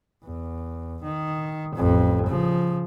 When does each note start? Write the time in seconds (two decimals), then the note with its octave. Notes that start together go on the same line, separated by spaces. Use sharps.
0.24 E2
1.03 D#3
1.75 A1 F2
2.27 C#3 F3